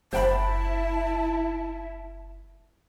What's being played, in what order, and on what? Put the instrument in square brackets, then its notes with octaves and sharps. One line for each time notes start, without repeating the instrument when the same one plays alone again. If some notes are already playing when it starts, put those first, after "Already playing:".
[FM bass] F#1 [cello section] E4 [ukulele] C5 G5 B5 [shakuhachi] A5